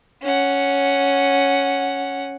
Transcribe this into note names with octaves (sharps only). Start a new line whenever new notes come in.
C#4 F#5